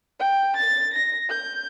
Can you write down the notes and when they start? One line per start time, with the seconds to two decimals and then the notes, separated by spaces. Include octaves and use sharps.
0.20 G5
0.56 A6
0.93 A#6
1.29 G6